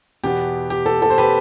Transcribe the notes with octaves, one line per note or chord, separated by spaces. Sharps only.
E2 B2 B3 G4
G4
A4
A4
C5
G4 B4